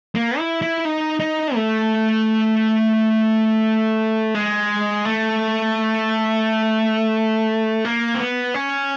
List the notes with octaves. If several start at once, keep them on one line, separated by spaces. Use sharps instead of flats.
A#3
E4
E4
D#4
D#4
A3
G#3
A3
A#3
C4
B3
C#4